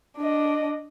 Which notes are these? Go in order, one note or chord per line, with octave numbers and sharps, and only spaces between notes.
D4 D#5